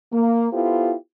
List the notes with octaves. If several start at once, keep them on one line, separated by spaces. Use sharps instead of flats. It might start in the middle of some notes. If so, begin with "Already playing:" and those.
A#3
B3 E4 F4 G4 A4 C5